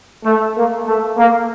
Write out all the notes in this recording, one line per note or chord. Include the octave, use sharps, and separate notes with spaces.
A3
A#3
A3
A#3